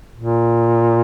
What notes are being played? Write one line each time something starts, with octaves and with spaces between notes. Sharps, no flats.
A#2